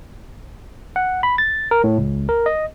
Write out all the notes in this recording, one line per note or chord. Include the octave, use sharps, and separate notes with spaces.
F#5
B5
A6
A#4
A2
C#2
A#4
D#5